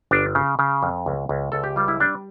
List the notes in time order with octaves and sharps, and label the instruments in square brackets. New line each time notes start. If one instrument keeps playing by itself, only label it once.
[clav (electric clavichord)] G1 D4
C#3
C#3
F2
C#2
C#2
C#2 A4
G4
G3 F4
E4
G3 D4